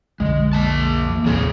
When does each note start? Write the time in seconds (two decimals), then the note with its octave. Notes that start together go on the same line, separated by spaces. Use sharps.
0.20 B1 F2 D3 G#3
0.53 A#3 A5
1.09 E3 F3
1.26 A1 D#2 C3 G3 C4 G#4